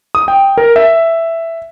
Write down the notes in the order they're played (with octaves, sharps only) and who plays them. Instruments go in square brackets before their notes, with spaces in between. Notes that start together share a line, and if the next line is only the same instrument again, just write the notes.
[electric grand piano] D#6
G5
A#4
E5